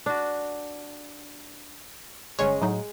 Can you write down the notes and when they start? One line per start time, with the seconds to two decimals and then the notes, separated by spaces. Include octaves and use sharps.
0.06 D4 F#4
2.39 G1 G#3 C#4 C#5
2.61 A2 F#3 D#4